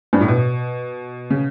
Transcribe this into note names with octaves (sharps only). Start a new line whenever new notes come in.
G2
A2
B2
C#3